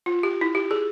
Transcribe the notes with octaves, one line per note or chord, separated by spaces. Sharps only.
F4
G4
E4
G4
G#4